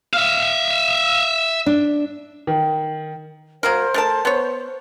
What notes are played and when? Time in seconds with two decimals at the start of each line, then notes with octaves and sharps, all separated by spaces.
0.14 E5 F5
1.66 D4
2.47 D#3
3.63 F#3 A#3 A#4 C5
3.94 A3 A#4 A5
4.25 B3 C#5